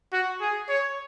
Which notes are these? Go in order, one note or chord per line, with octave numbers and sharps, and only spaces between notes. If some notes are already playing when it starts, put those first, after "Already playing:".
F#4
G#4
C#5